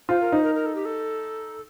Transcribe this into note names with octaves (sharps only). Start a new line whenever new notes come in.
F4 C5
A#4
D#4 C5
A#4
A#4
A4
G4
A4